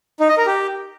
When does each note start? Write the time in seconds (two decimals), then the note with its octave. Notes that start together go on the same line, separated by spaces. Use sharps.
0.20 D#4
0.29 D#5
0.38 A#4
0.46 G4